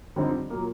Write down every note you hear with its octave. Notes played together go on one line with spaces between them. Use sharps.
F2 D3 G3 C4 D#4
A#2 F#3 A#3